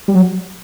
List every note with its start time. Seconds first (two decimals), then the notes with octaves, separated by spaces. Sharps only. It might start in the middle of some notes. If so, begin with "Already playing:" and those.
0.08 G3
0.15 F#3